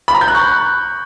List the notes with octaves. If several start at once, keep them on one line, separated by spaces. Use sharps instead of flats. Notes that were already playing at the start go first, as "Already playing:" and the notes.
B5
A#5
G6
F#6
C#6